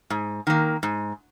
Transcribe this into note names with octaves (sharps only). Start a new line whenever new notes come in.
G#2
D#3 A#3
G#2